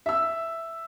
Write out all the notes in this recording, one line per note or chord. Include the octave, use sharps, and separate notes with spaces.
E5 E6